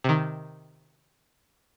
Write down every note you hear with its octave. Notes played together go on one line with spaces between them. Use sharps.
C3 D#3